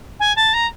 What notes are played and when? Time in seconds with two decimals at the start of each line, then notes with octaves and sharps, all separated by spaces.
0.19 G#5
0.36 A5
0.53 A#5